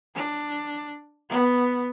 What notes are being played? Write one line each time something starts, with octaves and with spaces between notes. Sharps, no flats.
D4
B3